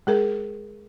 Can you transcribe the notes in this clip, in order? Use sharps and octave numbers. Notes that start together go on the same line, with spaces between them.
G#3 G#4 A#4